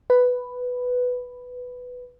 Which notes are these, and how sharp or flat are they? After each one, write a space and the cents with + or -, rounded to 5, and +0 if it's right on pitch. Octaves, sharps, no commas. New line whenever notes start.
B4 +5